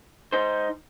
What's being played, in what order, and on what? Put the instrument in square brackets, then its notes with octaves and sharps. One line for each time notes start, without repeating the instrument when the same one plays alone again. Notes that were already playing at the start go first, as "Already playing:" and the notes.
[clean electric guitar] D#4 C5